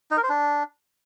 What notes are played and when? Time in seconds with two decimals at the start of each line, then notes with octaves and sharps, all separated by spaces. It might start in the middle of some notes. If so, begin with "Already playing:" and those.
0.11 D#4
0.17 A#4
0.23 C5
0.29 D4